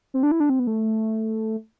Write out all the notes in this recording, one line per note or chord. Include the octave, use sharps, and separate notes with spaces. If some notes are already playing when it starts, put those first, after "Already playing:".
C4
D4
E4
D4
C4
B3
A3